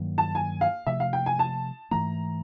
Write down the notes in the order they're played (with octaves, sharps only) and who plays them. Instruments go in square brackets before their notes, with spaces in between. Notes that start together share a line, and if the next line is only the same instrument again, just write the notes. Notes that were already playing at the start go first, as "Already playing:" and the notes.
Already playing: [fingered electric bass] G2 D#3 F#3 A#3
[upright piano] A5
G#5
F5
[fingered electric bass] C3 F3 A3 [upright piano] E5
[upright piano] F5
G5
G#5
A5
[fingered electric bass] G#2 E3 A3 [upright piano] A#5